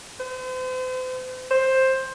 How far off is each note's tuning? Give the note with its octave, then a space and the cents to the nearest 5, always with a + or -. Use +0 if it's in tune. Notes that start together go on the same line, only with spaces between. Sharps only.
C5 -40
C5 +10